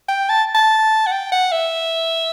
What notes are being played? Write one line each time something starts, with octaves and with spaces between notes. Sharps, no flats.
G5
A5
A5
F#5
G5
F#5
E5